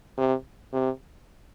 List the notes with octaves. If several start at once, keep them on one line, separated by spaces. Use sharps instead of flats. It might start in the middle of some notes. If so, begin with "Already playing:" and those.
C3
C3